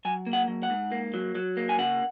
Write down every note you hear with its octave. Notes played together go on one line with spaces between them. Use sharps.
F#3 G#5
A#3
F#5
F#3
F#5
G#2
A#3
F#3
F#3
A#3
G#5
C#3 F#5